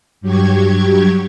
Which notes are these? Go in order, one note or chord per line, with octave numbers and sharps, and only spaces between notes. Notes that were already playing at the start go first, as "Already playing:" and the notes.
G2 F#3 G4 C#6 G#6